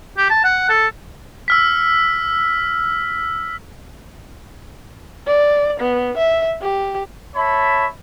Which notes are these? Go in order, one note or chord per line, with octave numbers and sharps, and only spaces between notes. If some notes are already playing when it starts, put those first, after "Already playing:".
G4
A5
F#5
A4
E6 F6 B6
D5
B3
E5
G4
C#5 E5 A5 B5